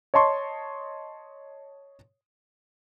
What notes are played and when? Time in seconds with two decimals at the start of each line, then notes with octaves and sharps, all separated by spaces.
0.14 C#5 D#5 A5 C6 C#6